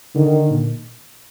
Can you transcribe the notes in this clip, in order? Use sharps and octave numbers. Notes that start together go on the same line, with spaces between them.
D3 D#3
A#2